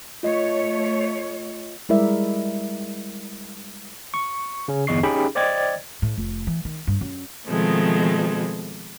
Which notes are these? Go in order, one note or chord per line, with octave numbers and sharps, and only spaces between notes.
A3 F4 C#5 D#5
G3 G#3 E4 A#4 D5 E5
C#6
C#3 C#4
G1 E2 D#5 C#6 C7
C#4 D#4 G4 G#4 G5 B5
C5 D5 D#5 G5 G#6 A6
A2
F1
E3
D#3
G2
F#2
B2 D#3 F3 G#3 A3 C4